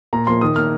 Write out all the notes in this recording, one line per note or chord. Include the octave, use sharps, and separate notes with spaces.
A#2 A#5
F3 A#3 C6
D#3 D#6
A#3 F6